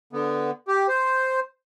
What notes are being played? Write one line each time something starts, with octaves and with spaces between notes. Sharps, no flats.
D3 B3
G4
C5